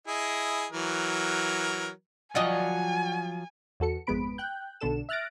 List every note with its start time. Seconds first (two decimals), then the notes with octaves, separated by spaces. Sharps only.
0.07 E4 G#4 D#5
0.72 E3 F#3 A#4
2.35 F3 F#3 F4 F#4 D5 D#5 G#5
3.80 E2 F#4 A4 C#7
4.07 G#1 F2 G#3 B3 B5 D7
4.38 G5 F#6 G6
4.81 B1 B2 D3 D4 A4 E7
5.09 E5 F6 F#6 A6 A#6 D7